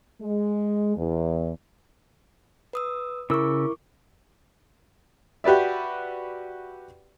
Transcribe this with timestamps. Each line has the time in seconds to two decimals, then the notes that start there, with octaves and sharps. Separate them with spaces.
0.21 G#3
0.96 E2
2.73 B4 D#6 E6
3.30 C#3 E4 A#4 C#6 D6 E6
5.44 F#4 G4 B4 D5 E5